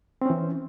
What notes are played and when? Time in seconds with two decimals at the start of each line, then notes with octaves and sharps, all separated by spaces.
0.22 C4
0.26 C#4
0.30 E3